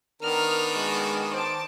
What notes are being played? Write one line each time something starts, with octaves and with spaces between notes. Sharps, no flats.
D#3 B3 D4 A#4 F6
G#3 F#4
C5 A5 D6